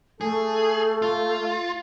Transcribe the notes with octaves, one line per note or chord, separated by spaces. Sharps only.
A3 G#4 A4
F4